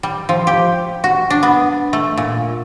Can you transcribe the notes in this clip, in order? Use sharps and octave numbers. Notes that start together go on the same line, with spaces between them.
G3
F3
G4
F#4
D4
B3
A3
A#2